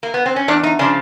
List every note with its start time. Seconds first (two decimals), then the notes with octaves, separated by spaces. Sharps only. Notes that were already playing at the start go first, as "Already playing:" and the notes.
0.03 A#3
0.14 B3
0.26 C4
0.36 C#4
0.48 E2 D4
0.63 D#4
0.79 C#3 F3 D4